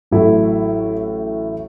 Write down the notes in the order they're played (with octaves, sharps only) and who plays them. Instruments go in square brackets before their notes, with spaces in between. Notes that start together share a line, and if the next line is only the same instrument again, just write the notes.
[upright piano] A1 A2 F#3 A3 E4